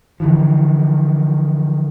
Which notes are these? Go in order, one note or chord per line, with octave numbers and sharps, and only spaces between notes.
D3 E3 F3